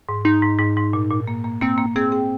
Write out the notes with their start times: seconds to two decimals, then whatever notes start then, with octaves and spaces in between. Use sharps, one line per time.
0.09 G#2
0.25 G#2 D#4
0.42 G#2
0.59 G#2
0.77 G#2
0.93 A#2
1.11 A#2
1.27 A#3
1.44 A#3
1.61 A#3 C4
1.78 A#3
1.96 C4 G#4
2.12 G#4